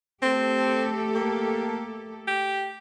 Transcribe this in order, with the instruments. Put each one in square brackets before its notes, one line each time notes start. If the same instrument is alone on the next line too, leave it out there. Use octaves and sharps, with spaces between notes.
[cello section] A3 G4 A4 [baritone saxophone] C4
[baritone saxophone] A#3
G4